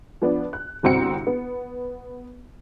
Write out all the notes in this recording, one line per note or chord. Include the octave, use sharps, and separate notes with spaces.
F3 B3 D4
F#6
G1 C2 C4 F#4 C#7
B3